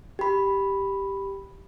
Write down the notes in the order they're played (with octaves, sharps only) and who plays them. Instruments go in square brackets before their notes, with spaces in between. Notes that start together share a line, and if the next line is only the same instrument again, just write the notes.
[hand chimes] G4 B5